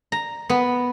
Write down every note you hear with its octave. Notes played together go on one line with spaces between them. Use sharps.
A#5
B3